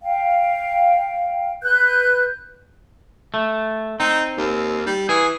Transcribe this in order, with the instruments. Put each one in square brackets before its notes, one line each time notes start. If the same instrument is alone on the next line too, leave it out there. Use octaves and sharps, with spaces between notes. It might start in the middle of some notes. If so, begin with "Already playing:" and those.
[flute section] F5 G5
B4 F#6 G6
[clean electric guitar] A3
[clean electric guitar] C4 [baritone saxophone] D#4
[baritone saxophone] D#2
G3
[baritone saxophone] E3 [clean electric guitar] G#4